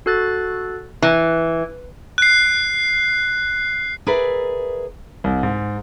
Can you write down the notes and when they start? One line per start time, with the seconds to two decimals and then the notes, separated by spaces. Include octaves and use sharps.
0.06 F#4 A4 F#6 A6
1.02 E3
2.18 F#6 C7
4.07 G#4 A#4 B4 D5 E5
5.24 C2
5.43 G#2